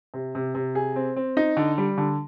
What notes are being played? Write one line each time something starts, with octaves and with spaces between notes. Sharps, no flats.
C3
C3
C3
G#4
C4
C4
D#4
D3
G3
D3